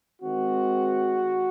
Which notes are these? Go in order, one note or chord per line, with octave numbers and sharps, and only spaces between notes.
D#3 G#3 C4 F#4